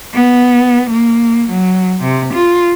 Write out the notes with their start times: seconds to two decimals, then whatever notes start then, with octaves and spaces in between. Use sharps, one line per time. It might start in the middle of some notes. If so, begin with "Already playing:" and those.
0.14 B3
0.90 A#3
1.49 F#3
2.03 C3
2.33 F4